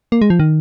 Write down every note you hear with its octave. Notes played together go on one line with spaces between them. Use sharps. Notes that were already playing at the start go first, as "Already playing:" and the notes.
A#3
G#3
F3
D#3